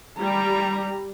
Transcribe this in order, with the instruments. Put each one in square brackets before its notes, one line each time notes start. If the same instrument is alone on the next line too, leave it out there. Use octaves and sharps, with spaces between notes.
[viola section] G3 [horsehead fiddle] A#5